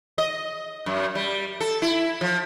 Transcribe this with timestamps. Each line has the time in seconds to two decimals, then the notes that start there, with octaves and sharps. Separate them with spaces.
0.18 D#5
0.86 F#2
1.15 G3
1.60 A4
1.82 E4
2.21 F3